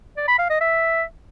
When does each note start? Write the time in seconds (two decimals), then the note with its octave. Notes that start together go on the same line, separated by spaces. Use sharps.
0.17 D5
0.28 B5
0.39 F5
0.50 D#5
0.61 E5